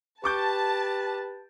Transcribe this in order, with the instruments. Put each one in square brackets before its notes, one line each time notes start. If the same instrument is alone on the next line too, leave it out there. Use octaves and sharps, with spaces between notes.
[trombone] G4 [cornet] B4 [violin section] A5 [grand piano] C#6 D6 G6